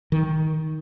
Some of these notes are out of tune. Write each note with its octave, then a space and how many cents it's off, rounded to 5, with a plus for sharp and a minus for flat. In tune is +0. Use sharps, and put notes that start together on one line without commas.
D#3 +10